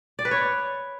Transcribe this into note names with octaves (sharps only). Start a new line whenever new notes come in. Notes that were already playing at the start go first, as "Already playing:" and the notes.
D5
B4
C#5